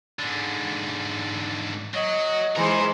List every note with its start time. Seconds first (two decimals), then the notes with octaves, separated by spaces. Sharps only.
0.19 G#2 D3
1.94 F#3 F#4 D#5
2.56 E3 G#3 D#4 A#4 C5